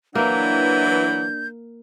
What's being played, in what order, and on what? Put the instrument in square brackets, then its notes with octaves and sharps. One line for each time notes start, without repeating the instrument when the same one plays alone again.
[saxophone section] E3 F#3 [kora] A#3 [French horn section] D4 [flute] G6